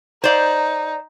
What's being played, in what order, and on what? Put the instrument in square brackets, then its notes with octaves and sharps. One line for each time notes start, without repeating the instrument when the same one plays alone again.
[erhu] D#4 [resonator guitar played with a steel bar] C5 D5 F5